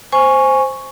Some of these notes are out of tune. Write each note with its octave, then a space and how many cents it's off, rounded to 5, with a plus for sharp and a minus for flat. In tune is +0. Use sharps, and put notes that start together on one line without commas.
C5 +0 G#5 +0 C#6 +0